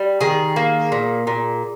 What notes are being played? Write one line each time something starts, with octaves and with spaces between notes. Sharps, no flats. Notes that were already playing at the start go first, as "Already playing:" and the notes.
Already playing: G3
D#3 G#4
A#3
A#2
A#2